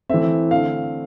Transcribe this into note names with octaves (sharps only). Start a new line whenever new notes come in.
E3 A3 C4 E5
D3 A3 C4 F5